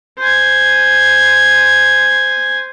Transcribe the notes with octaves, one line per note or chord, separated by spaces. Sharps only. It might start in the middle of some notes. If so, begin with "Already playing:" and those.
C5 G#5